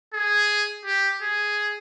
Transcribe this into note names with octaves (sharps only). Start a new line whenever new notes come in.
G#4
G4
G#4